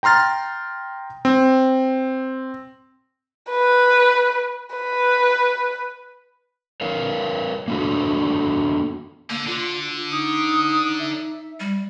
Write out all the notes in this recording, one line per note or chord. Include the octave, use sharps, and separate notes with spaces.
G5 A#5 C6 F6 A6
C4
B4
B4
A#4 B4 C#5 F5
A#3 B3 D4 F#4 A4
D3 A#3
D3 F4
D#4 D#6
E5
G3